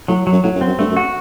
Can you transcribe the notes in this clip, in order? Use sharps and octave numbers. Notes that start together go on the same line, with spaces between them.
A2 F#3
F#3
F#2
A2 F#3
F#2
C4
F#2
G2 A3
F#2
F#4